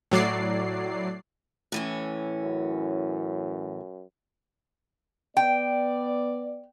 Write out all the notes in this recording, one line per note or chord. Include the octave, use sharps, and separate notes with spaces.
A2 F#3 D5 C7
A2 E3 C#4
F#2
B3 D5 G5